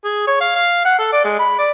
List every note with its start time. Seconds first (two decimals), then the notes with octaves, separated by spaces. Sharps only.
0.04 G#4
0.27 C#5
0.41 F5
0.56 F5
0.85 F#5
0.99 A4
1.12 D5
1.24 G#3
1.39 B5
1.59 D5